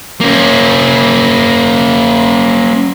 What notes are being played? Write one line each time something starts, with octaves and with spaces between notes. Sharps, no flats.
A#3 C#4